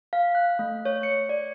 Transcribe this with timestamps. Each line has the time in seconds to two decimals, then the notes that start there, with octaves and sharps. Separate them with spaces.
0.13 F5
0.35 F#6
0.59 A3
0.85 C#5
1.03 C#7
1.29 D5